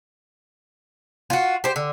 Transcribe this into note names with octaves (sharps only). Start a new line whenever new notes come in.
F4 F#4
G4 C5
D3